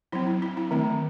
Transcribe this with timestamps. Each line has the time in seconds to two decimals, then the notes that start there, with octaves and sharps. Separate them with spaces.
0.12 F#3 C4 E4
0.27 E4
0.42 E4
0.57 E4
0.71 D#3 A3 C4